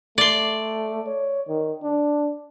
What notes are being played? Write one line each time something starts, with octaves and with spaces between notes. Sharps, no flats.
A3 D5 C6
C#5
D#3
D4